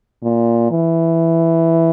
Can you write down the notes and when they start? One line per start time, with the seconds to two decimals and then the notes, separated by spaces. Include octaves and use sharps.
0.23 A#2
0.71 E3